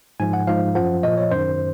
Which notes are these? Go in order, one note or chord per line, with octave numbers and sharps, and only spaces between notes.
G#2 F3 G#5
F#5
G#2 F3 F5
F#2 F3 F#5
A#2 F3 D#5
C#5
F#2 D#3 C5